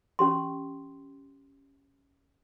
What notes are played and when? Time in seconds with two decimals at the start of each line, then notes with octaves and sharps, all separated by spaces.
0.19 C#4 G4 C6